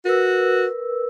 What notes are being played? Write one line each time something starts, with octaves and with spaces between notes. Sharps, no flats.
F#4 A#4 B4 E6